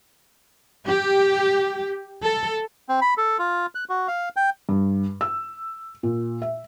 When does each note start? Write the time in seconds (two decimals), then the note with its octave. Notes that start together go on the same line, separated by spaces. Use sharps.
0.87 G4
2.23 A4
2.89 C4
3.01 B5
3.18 A4
3.39 F4
3.75 F#6
3.89 F#4
4.08 F5
4.36 G5
4.69 G2
5.21 E6
6.03 A#2
6.42 E5